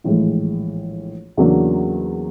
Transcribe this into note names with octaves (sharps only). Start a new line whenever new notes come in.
A#1 A2 E3 G#3
E2 C#3 F#3 A#3 D4